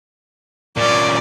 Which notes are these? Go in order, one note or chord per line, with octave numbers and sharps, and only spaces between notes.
A#2 C#4 D5